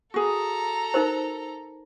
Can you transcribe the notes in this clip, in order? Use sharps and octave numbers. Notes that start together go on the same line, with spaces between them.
F#4 G#4 A4 A#5
D#4 A#4 C5